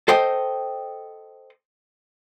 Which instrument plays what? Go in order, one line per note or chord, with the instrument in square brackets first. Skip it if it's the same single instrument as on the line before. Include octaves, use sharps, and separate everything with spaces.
[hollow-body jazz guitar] A4 C5 D#5 G5